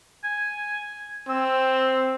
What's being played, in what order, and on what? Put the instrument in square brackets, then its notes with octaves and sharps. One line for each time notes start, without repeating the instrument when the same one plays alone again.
[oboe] G#5
[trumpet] C4 [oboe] E6